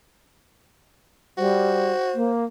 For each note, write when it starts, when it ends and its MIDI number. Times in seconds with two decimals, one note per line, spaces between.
1.38 1.92 55
1.38 2.13 66
1.38 2.31 72
2.14 2.44 58